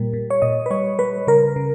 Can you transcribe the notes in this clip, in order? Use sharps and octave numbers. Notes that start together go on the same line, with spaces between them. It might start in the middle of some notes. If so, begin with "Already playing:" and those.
Already playing: A#2 G3 A#4
A#2
C#5
A#2 D#5
B4
G3 C#5
G3 B4
C#3 A#4
C#3